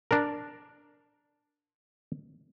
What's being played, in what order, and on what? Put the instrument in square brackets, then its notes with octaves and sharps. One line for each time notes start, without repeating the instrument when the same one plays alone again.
[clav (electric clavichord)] D4 A#4